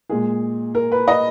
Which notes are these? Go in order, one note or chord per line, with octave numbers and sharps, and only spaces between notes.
A#2 G#3 G#4
A#4
B4
D#5